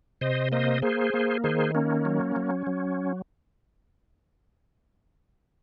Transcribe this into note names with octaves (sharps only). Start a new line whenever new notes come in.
C3 C5 D#5
A#3 C5 D#5
A#3 G#4 C5
A#3
D#3 G#4 C5
A#3 C#4
F#3
F#3
F#3